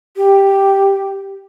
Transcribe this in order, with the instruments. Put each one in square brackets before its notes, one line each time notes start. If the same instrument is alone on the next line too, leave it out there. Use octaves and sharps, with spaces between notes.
[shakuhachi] G4